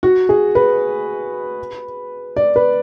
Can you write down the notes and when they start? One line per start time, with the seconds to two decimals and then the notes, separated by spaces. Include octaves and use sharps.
0.03 F#4
0.29 G#4
0.55 B4
2.36 D5
2.56 B4